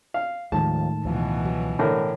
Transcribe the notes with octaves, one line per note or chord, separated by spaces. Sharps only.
F5
D#2 A2 D#3 F3 G#3 A5
C#2 B2 E3 F3
F#3
A2 D3 A#4